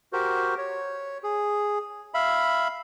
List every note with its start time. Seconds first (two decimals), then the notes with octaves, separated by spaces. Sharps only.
0.13 F#4 G4 A#4 C5
0.58 C#5
1.23 G#4
2.14 E5 F5 B5